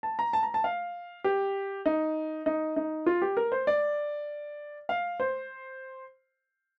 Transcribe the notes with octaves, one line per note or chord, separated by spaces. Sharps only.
A5
A#5
A5
A#5
A5
F5
G4
D#4
D#4
D#4
F4
G4
A#4
C5
D5
F5
C5